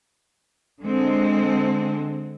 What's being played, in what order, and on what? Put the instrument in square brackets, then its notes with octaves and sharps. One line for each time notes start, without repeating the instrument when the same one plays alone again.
[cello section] D3 G#3 C4